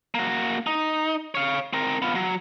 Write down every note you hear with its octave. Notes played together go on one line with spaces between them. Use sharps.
A#3 F#4
D#4
C#5 F5
C4 A#4
B3 F4
F#3